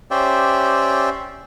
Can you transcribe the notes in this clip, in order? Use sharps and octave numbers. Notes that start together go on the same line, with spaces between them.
C#4 G4 C5 D5 E5 G5